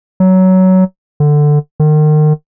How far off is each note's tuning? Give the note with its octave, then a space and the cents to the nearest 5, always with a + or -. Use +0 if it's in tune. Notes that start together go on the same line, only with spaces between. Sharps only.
F#3 +15
D3 +10
D#3 -35